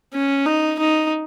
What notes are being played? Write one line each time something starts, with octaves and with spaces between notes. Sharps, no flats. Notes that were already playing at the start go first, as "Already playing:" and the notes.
C#4
D#4
D#4